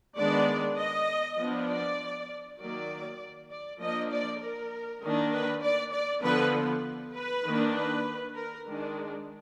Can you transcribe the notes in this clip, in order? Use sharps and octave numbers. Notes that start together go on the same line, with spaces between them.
D#3 G#3 B3 D4 D5
D#5
F3 B3 D4
D5
D#3 F#3 A#3 D5
D5
F3 A#3 D4 D#5
D5
A#4
D#3 A#3 D4
B4
D5
D5
D3 F3 B3 B4
B4
D#3 A#3 D4
B4
A#4
D#3 G#3 D4